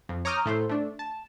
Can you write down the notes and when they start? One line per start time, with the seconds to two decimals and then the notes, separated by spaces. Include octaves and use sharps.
0.09 F2
0.25 C#5 A#5 D6 D#6 F6 G6
0.46 A2 A3 C5
0.70 A3 D4
0.99 A5